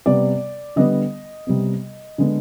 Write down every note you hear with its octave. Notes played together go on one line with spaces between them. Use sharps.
C3 G3 B3 D5
D3 G3 B3 D#5
C3 G3 B3
D3 G#3 B3